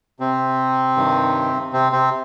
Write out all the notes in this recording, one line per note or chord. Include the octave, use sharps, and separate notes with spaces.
C3 C4
G2 D#3
C3 C4
C3 C4